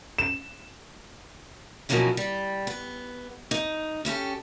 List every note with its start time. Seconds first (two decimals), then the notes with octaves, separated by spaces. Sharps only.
0.18 E7
1.89 B2 F3 F#3 A#3 C#4 E4
2.17 G3
2.67 B3
3.51 D#4
4.05 C#4 E4 G4 A4